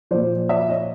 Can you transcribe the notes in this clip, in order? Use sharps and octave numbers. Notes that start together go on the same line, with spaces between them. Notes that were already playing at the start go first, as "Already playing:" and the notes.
A#2 F3 C5 D5
D5 E5
C#5 D#5